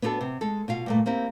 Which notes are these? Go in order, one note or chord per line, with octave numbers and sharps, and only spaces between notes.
B3 D4 E4 F#4 A4
C3
G#3 A4
B2 F4 F5
G2 A#2 A3
A#3 C4 E4 G4